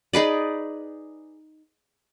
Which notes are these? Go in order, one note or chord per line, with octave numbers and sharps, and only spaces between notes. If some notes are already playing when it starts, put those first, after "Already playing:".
D#4 G#4 B4 D5